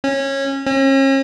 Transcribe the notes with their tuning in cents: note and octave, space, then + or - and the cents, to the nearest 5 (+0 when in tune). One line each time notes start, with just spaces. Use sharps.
C#4 -20
C#4 -40